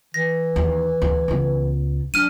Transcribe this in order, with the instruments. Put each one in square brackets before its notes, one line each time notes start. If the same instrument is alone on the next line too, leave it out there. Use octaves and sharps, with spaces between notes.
[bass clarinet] E3 [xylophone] A#6
[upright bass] D#2
D2
C#2 B3
[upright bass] F#3 [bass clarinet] D4 [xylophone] F6 D#7